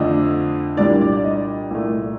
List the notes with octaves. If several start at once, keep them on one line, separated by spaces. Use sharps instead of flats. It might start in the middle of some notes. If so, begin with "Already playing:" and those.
Already playing: F2 D3 A3 D4 D#5
C2 A#2 G3 D4 D5
D5
D5
D#5
C2 A#2 A3